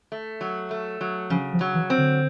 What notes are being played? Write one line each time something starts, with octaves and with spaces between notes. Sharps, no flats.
A3
F#3
A3
F#3
C#3 F3
F3
F#3
E3
C4
D3